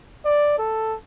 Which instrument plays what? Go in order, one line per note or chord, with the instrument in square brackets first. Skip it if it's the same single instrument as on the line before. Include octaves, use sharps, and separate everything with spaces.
[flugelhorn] D5
A4